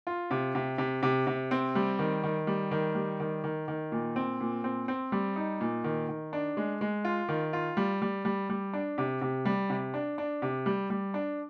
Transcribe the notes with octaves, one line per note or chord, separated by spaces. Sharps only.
F4
C3
C3
C3
C3
C3
C4
G3
D#3
D#3
G3
D#3
G3
D#3
D#3
D#3
A#2
C4
A#2
C4
C4
G3
D#4
A#2
D#3
D#3
D4
G#3
G#3
F4
D#3
F4
G3
G3
G3
G3
D4
C3
C3
G3
C3
D4
D4
C3
G3
G3
D4